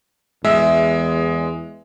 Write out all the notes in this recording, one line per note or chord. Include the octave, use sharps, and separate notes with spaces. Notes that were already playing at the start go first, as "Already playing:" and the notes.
E2 G#3 E5